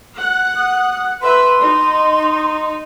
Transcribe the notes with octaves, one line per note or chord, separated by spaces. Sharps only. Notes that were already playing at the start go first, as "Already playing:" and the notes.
F#5
D#6
B4 E5 C6
D#4